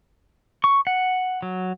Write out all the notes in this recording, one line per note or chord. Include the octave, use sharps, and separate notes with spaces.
C#6
F#5
F#3